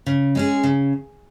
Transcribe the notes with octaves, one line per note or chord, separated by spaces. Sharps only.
C#3
G#3 C#4 G#4
C#3